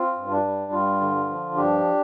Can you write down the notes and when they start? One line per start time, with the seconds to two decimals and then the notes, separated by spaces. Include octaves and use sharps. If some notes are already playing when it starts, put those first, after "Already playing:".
Already playing: C4 F4
0.16 G2
0.31 D4
0.44 G3
0.72 G2 F4
1.01 D3
1.29 F3
1.56 G2 D4 G4